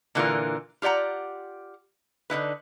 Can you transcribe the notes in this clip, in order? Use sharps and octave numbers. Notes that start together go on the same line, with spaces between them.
A#2 D3 E3 A3 F4 A#4
F4 G4 D5 F#5 A#5
D3 D#4 E4 B4